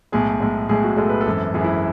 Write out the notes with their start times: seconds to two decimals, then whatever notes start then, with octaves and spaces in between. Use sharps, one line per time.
0.12 B1 A2 G#3 G#4
0.40 B1 A2 G#3
0.69 B1 A2 G#3 G#4
0.84 F#4
0.97 B1 A2 G#3 A4
1.09 B4
1.21 A4
1.26 G#1 F#2 E3
1.54 G#1 F#2 E3 G#4
1.64 E4